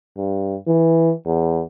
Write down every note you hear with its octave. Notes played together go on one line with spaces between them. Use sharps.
G2
E3
E2